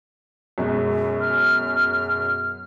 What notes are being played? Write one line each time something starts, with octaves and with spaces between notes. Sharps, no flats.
F#2 B2 G#3
F6